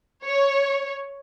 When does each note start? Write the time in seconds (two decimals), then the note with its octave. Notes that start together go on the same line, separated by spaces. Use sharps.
0.24 C#5